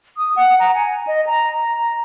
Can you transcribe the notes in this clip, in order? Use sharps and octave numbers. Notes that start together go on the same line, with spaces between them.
D#6
F#5
A#5
G#5
D#5
A#5
A#5